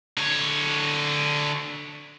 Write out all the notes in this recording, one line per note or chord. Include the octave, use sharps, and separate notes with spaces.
D3 C#5